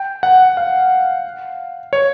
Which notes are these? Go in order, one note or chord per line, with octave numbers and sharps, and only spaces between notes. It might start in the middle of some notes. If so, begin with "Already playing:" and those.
Already playing: G5
F#5
F5
C#5